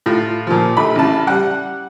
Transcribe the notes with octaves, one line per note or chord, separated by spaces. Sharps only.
A2 F4
A#2 F3
A#1 A3 B5
A1 C#3 A5
G3 F#5 F#6